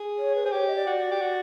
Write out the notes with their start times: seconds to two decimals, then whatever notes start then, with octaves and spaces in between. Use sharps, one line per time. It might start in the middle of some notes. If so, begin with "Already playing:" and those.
Already playing: G#4
0.18 C#5
0.36 B4
0.44 G#4 C5
0.52 G4 C#5
0.67 D#5
0.76 D5
0.87 F#4
0.98 D5
1.11 G4
1.22 F#4